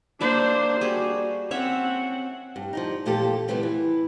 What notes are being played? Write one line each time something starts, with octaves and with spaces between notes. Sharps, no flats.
A#3 D4 C5 D5 E5
G3 F#4 G#4
C4 C#4 C#5 E5 F#5
G2
F3 G3 D#4
E2 A#2 F3 A#3 G4 A4
C3 E3 F3 G3 A3 B3
E3